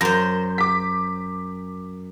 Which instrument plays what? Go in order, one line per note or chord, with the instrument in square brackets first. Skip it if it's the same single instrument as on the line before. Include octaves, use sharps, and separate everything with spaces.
[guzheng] F#2 C5 [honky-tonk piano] A#6
[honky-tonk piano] D6 B6